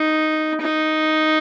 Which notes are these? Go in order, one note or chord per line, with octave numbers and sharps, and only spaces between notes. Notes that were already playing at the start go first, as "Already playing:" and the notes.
Already playing: D#4
D#4